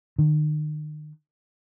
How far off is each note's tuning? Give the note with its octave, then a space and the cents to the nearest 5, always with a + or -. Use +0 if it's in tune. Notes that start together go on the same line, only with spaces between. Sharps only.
D#3 -40